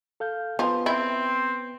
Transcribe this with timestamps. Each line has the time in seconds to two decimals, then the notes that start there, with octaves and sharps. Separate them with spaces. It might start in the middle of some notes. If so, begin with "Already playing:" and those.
0.20 A4 F5 G6
0.59 F3 B3 B4
0.86 C4 E4